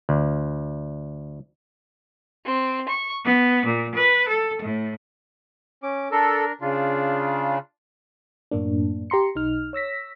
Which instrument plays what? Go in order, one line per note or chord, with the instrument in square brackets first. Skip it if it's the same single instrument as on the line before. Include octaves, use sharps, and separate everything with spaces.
[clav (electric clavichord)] D2
[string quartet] C4
C#6
B3
A#2
B4
A4
A2
[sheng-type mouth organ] C#4 D6
[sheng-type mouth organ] D4 A#4 [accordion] A4
[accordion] C#3 [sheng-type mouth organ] D4 F4
[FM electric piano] F#2 A2 A#3 D4
G4 A#5 C6 C#7
B1 D#4 F6
C#5 E6 A#6 B6